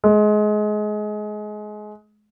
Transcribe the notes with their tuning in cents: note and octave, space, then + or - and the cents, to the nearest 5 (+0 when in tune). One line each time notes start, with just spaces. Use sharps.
G#3 +25